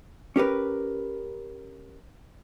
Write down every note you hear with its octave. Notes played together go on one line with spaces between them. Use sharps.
C#4 G4 A#4 B4